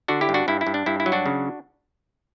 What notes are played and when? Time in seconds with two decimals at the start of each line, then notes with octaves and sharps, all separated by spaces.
0.08 D3 D4 F#4
0.21 E4 G4
0.29 G2
0.34 D4 F#4
0.48 G2 E4
0.61 E4
0.67 G2
0.74 D4
0.86 G2 E4
1.00 E4
1.06 F#3
1.12 D4 F#4
1.26 C#3